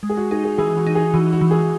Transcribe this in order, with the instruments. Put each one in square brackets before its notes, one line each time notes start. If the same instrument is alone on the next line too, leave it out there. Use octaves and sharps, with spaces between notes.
[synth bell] G#3
[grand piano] G#4
F#4
[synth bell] D#4 [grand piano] G#4
[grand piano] G#4
[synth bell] E3 [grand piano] G#4
[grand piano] F#4
[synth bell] D#4
[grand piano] G#4
[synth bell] E3 [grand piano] F#4
[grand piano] F#4
[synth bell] E3
[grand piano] G#4